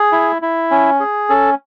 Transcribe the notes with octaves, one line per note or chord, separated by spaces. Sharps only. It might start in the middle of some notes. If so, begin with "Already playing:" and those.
Already playing: G#4
E4
E4
C#4
G#4
C#4 A4